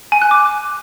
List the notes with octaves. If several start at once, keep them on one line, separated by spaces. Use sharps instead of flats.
G#5
F#6
D6